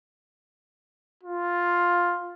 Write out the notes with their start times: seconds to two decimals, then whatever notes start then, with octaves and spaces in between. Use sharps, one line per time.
1.24 F4